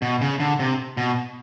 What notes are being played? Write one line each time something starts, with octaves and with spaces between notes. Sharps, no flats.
B2
C#3
D3
C3
B2